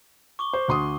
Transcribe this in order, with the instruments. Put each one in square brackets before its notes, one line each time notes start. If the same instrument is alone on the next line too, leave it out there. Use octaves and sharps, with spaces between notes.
[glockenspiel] C#6 D6 G7
[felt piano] C5
D2 C6 D#6